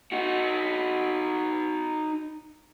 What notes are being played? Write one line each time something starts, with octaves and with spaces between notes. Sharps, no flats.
D#4 F#4